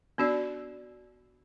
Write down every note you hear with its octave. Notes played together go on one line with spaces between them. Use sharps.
B3 D4 F#4 D5